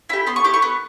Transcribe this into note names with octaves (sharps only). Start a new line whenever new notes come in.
E4 G4 B5
B3 C6
C#6
E4 G4 D6
C#6
B3